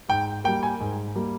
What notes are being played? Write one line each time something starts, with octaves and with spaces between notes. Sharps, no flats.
G#2 G5
G3 A#3 G5
G#5
G#2
G3 A#3